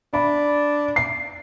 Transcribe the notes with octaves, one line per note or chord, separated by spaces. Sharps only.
D4 B5
C7